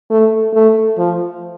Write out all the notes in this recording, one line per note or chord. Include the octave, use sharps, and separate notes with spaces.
A3
A3
F3